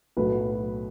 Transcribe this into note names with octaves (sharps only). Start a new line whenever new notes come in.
B1 A2 F#3 A3 B4